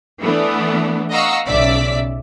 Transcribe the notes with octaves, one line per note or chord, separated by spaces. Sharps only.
E3 A3 B3 D4
D#5 F5 F#5 A#5 C#6 E6
B1 C#3 D5 E5 B6